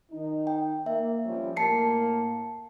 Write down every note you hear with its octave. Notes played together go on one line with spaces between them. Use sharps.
D#3 D#4
G5
A#3 E5
F3 G3 C#4
A2 A#3 A5 C7 C#7